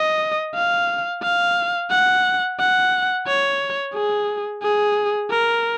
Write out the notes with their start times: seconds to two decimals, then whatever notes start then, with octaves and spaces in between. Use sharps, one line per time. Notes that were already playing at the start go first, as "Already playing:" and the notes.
Already playing: D#5
0.55 F5
1.23 F5
1.90 F#5
2.59 F#5
3.27 C#5
3.94 G#4
4.63 G#4
5.30 A#4